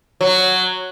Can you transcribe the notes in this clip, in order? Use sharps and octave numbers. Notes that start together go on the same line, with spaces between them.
F#3